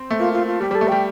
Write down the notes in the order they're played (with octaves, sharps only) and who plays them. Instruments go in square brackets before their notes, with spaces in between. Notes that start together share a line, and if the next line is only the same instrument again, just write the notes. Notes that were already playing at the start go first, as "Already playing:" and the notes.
Already playing: [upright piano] C4
A3
[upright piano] A#3 [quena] F4
[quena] F4
F4
[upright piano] G3 [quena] G4
[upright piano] G3 [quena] A4
[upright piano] A3
[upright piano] G3 [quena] G5